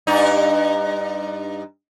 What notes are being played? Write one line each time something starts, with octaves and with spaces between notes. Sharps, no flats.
G2 D#4